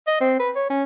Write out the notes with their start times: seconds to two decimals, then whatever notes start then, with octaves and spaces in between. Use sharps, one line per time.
0.07 D#5
0.21 C4
0.40 B4
0.56 C#5
0.70 C#4